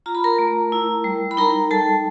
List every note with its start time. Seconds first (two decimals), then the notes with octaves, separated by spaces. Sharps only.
0.06 F4 A#5
0.15 B5
0.24 A#4 A#5
0.39 A3
0.72 E4
1.04 G3
1.31 B5
1.37 D#4 A#4 A#5
1.71 G3 A4 A5